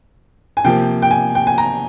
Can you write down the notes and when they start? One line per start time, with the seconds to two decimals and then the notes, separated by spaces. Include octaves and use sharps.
0.57 G#5
0.65 C3 F3 A#3 G5
1.02 G5
1.11 G#5
1.35 G5
1.47 G#5
1.58 A#5